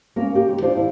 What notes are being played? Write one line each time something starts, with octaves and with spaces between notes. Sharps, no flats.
A#3 C#4 A#4
G4
D#2 G4
D#3 D4 F4 C5 D5
E4